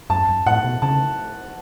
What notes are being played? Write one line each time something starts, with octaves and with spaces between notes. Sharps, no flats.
F#2 A5
F#2
A2 F#5
B2
C#3 A5